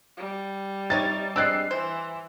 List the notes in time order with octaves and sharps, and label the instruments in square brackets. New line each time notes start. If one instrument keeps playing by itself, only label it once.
[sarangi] G3
[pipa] C3 D#4 C#5 [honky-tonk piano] A6
[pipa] G#3 C4 D4 [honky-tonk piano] E6 F#6 C7
[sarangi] E3 [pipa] C5